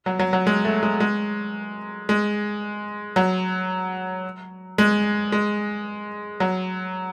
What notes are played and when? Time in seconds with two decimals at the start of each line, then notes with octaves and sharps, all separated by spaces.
0.06 F#3
0.19 F#3
0.33 F#3
0.47 G#3
0.65 A3
0.83 G#3
1.00 G#3
2.09 G#3
3.16 F#3
4.78 G#3
5.32 G#3
6.40 F#3